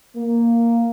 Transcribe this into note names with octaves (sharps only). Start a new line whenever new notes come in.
A#3